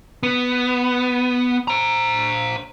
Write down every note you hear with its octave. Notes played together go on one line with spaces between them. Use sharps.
B3
C5 A#5